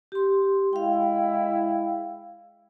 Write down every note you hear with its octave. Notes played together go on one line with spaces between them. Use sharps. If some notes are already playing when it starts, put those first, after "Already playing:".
G4 C6
G#3 E4 F5 G5